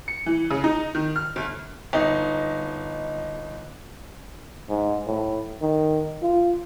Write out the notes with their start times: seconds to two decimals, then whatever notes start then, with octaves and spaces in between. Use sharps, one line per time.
0.08 C#7
0.26 E3
0.50 C#3
0.64 D#4
0.95 D#3
1.16 F6
1.36 G1
1.93 G1 D#4 D#5
4.70 G#2
5.06 A2
5.62 D#3
6.22 F4